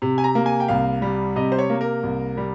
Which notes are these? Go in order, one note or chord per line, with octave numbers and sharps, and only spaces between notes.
C3
G#5
A#5
A#3
G#5
G5
C2 F5
G3
C3 D#5
C5
C#5
A#3
A#4
C2
G3